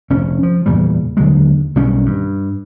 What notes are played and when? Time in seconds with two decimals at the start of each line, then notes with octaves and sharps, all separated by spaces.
0.10 F1 C#4
0.43 F3
0.66 E2 A#2 C#3 G3
1.17 D#2 D3 F#3 G#3
1.76 B1 D#3 G3 C#4
2.06 G2